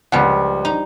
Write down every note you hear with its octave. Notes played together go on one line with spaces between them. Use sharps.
C#2 F3 G3 F#5
D#4